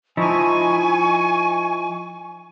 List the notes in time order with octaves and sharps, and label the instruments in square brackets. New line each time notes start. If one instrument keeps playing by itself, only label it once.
[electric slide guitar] F3 D#4 E4 [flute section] G#5 C#6